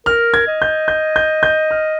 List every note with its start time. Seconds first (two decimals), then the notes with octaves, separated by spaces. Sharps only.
0.06 A#4 F6
0.34 G#6
0.47 D#5
0.62 G6
0.88 G6
1.16 G6
1.43 G6
1.71 F6